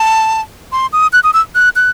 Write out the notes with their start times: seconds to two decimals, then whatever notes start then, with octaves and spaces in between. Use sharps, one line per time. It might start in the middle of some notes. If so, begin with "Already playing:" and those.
Already playing: A5
0.72 C6
0.93 D#6
1.13 F#6
1.24 D#6
1.34 E6
1.55 F#6
1.76 F#6